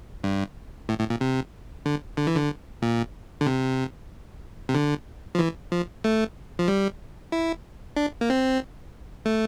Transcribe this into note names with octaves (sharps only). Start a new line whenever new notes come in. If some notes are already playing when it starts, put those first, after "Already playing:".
G2
A2
A2
A#2
C3
D3
D3
E3
D3
A#2
D3
C3
C3
D3
F3
E3
F3
A3
F3
G3
E4
D4
A#3
C4
A3